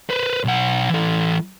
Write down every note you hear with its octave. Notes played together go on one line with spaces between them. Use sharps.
B4 C5
B1 F#5
E3 A4